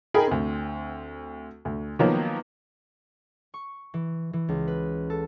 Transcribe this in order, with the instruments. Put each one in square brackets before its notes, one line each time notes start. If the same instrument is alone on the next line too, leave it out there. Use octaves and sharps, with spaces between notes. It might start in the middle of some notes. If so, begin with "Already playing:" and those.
[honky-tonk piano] D#4 G#4 A#4 G5 B5
D2 C4
D2
D#3 F3 F#3 A#3 B3
[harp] C#6
E3
E3
C#2
B4
A4